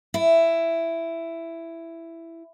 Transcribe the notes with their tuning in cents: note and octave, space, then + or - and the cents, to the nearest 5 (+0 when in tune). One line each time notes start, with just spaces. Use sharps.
E4 +10